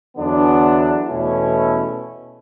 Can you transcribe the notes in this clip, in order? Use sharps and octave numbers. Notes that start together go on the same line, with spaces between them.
E2 D3 F#3 B3 D4
E2 B2 A3 C#4 E4